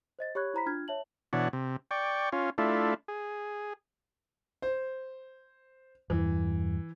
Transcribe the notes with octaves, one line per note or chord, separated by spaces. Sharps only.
C5 D#5 A6
G4 C#5 B5 C#6 F#6 G#6
E4 C5 A#5 B5 B6
D4 F4 F6 G#6
C#5 E5 A5 F#7
B2 E3 D4 C#5 F#5
C3
D5 G5 C#6
C#4 F4
A3 D4 E4 F4
G#4
C5
E2 G2 E3